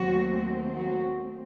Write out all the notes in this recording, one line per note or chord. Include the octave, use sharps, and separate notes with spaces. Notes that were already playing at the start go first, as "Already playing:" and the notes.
Already playing: D#2 D#3 F#3 A3 C4 F#4
F#3 F#4